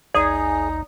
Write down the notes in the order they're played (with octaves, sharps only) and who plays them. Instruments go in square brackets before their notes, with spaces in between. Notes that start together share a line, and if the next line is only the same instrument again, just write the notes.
[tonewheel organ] A1 D#2 [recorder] D#4 [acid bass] G#4 [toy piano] D5 D#6